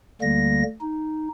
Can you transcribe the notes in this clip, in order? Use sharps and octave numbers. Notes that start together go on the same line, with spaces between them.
D2 D3 G3 A#3 A#6
D#4